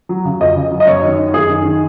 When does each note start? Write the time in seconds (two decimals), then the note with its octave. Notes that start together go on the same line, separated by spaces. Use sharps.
0.09 F#3
0.25 C#3
0.40 F2 D#5
0.56 C#3
0.71 F#3
0.80 D#5
0.87 F#2 C#5
1.03 D#3
1.19 D#3
1.34 F#2 G#4
1.49 D#3
1.65 D#3